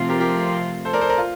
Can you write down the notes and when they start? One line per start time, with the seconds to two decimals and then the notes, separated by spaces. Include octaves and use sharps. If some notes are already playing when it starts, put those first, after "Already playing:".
Already playing: C3 F3 A3 C4 F4
0.09 G4 A#4
0.20 G4 A#4
0.85 A4 C5
0.93 A#4 D5
1.01 A4 C5
1.10 A#4 D5
1.18 F4